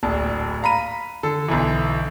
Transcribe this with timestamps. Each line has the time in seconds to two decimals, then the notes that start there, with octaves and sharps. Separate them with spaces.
0.03 D1 A#1 A5
0.63 F5 A#5 B5 D#7
1.23 D3 A4
1.48 B1 D3 E3